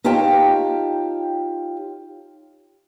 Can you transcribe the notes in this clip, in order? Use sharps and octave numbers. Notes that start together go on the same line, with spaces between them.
D#4 F4 G4 C#5 G5 A5